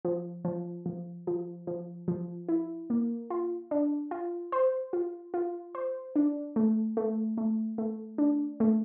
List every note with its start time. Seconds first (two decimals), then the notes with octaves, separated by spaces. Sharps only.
0.05 F3
0.45 F3
0.86 F3
1.27 F3
1.67 F3
2.08 F3
2.49 E4
2.90 A#3
3.30 F4
3.71 D4
4.11 F4
4.52 C5
4.93 F4
5.34 F4
5.75 C5
6.16 D4
6.56 A3
6.97 A3
7.37 A3
7.78 A3
8.18 D4
8.60 A3